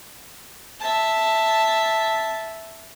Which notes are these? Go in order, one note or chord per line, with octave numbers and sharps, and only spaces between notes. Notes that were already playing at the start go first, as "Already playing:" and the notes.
E5 A5